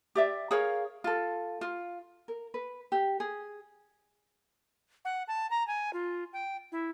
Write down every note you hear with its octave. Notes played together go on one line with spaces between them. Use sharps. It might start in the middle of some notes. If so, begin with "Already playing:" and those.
G4 D5 E5
G#4 A#4 C#5 F5
F4 A4
F4
A#4
B4
G4
G#4
F#5
A5
A#5
G#5
F4
G5
E4